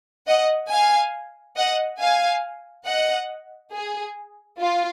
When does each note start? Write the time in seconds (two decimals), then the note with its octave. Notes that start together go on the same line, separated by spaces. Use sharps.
0.27 D#5 F#5
0.70 F5 G#5
1.56 D#5 F#5
2.00 F5 G#5
2.87 D#5 F#5
3.74 G#4
4.60 F4